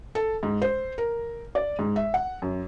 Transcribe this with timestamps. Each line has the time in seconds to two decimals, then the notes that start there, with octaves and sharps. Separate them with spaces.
0.15 A4
0.43 G#2
0.62 C5
0.98 A#4
1.55 D5
1.79 G#2
1.96 E5
2.14 F#5
2.42 F#2